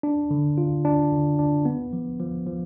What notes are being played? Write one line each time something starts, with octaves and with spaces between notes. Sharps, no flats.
D4
D3
F4
D4
D3
D4
B3
F3
F3
F3